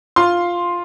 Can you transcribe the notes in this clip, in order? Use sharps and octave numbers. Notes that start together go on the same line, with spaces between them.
F4 C6